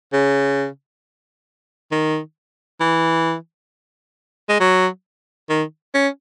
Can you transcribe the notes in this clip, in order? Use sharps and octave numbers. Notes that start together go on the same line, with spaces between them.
C#3
D#3
E3
G#3
F#3
D#3
C#4